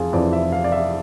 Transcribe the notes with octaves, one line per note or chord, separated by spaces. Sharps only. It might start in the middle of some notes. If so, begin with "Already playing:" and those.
Already playing: F1 F2 E3 F4 G#4
F1 F2 E3 D5
E5
F5
D5
E5